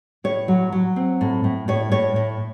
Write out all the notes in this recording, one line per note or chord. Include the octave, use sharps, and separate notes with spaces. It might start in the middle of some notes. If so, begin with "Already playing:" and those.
A2 C#5
F#3
F#3
C4
A2
A2
A2 C#5
A2 C#5
A2